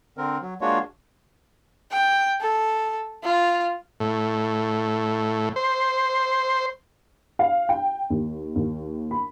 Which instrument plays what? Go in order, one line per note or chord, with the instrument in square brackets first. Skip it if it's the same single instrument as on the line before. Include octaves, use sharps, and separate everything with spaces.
[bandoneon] D3 C4 A#4
F#3
G#3 A#3 D4 F4 F#4 C#5
[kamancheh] G5
A4
F4
[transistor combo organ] A2
C5
[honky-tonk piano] F5
G5
D#2
D#2
B5